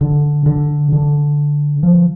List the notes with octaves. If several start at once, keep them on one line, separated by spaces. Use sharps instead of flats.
D3
D3
D3
F3